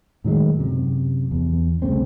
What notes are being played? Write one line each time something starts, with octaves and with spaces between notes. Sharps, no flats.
A2 D#3 F#3 G#3
F#2 C3
E2
C2 C#3 A3 C4